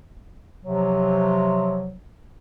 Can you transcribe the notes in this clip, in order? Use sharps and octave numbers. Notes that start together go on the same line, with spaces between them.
C3 F3 F#3